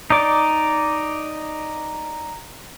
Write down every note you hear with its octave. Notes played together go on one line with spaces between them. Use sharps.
D#4 D5 D6